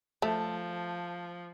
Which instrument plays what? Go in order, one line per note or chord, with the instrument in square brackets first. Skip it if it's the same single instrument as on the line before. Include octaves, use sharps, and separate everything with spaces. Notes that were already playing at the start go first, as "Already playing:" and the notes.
[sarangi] F3 [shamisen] A3 [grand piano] A5